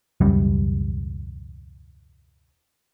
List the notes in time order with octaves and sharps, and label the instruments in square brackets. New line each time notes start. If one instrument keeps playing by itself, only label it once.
[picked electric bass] E1 C#2 F#2 G3